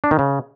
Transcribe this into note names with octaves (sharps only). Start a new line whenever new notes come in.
D4
D#3
C#3